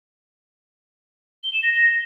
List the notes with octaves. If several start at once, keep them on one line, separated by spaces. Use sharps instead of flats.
G7
E7
A#6